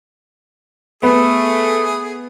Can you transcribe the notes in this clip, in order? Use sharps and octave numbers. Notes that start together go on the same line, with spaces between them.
A3 B3 G#4 B5 D#6